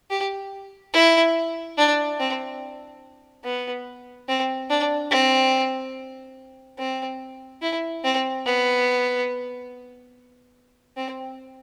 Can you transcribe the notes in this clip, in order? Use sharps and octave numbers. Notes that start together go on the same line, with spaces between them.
G4
E4
D4
C4
B3
C4
D4
C4
C4
E4
C4
B3
C4